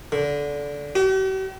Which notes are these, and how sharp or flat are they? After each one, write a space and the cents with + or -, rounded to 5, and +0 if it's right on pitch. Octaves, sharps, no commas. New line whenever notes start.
D3 -20
G4 -45